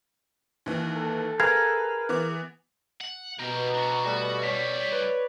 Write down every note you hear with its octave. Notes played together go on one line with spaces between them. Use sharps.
D#2 E3
A4
G#4 A#4 B4 F5 G#6
E3 B3 D6
F#5
B2 G4 A#4 A#5
D4 F#4
G3 A3 F#4
A2 G3 C#5 D5 B6
B4